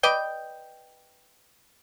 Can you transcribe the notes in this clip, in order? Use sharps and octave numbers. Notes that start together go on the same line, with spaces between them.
B4 D5 D#5 G5